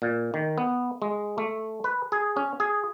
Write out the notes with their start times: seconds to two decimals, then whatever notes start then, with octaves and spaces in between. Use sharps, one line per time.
0.02 A#2
0.34 D#3
0.58 B3
1.02 G#3
1.38 A3
1.84 B4
2.12 G#4
2.37 C#4
2.60 G#4